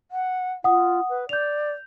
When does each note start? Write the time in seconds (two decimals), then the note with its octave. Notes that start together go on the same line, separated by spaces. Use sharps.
0.11 F#5
0.64 F4 F#5 D#6
1.09 B4
1.29 D5 G6 F7